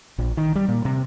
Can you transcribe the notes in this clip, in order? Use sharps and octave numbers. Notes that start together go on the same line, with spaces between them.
A#1
D#3
G3
A#2
C3